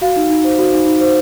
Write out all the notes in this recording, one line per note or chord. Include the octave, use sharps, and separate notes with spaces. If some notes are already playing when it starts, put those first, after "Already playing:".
F#4 F5
D#4
D#4
C5
F#4
D#4
D#4
C5